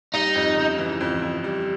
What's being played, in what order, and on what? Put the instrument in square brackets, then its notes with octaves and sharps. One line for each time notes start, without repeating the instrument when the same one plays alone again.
[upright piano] G3 [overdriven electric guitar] D#4
[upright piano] F2
C#3
E3
F2
F2
G3